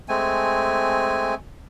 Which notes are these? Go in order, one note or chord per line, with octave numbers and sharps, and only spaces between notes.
G#3 A3 C4 G#5